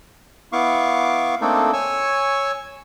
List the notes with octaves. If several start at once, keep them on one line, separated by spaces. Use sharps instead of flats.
B3 E4 F5 C#6 D6
A3 A#3 C4 D4 D#4 A4
C#5 G#5 C#6 E6